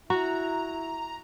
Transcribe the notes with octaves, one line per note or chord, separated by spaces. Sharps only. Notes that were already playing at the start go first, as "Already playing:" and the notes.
E4 F#4 A#5